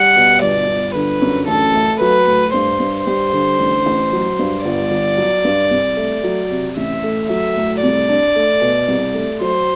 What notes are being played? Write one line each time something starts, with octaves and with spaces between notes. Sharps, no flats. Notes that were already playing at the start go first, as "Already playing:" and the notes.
Already playing: G3 F#5
B2
G1 D5
G1
D3 B4
F#2
A1 A4
A3
F#3 B4
A2
G2 C5
G2
G3 C5
D3
A1
A1
F#3
G2
G1 D5
G1
F#3
G2
C2
A3
F#3
C3
A1 E5
A3
F#3 E5
A2
C2 D5
D4
A3
B2
C2
A3
F#3 C5